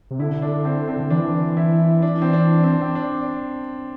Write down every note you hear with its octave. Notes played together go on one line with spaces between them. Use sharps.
C3
D3 E4
D4
C4
C4
D3
E3 D4
E4
D4
C4
D4
C4
D4
C4
D4